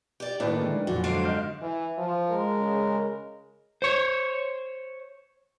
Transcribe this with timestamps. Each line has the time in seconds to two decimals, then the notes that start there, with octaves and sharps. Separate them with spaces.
0.20 G4 D5
0.40 A2 D#3 A#3 D#4 E4 B4 D5
0.62 D3 E3 G#3
0.87 F2 A#2 F#3 F#4
1.04 G#2 D3 F5 D7
1.23 D#5 F6 G6
1.62 E3
1.98 F3
2.30 G#3 A#4
2.59 C#3
3.82 C5 C#5